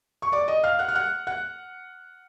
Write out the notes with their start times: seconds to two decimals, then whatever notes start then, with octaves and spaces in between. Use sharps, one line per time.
0.22 C#6
0.32 D5 D6
0.48 D#5 D#6
0.64 F5 F6
0.79 F#5 F#6
0.88 F6
0.95 F#5 F#6
1.27 F#5 F#6